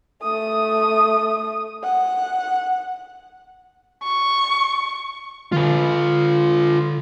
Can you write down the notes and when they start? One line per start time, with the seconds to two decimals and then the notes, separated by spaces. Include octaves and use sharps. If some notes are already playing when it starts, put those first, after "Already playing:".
0.23 A3 D#6
1.83 F#5
4.03 C#6
5.52 D3 F4 B4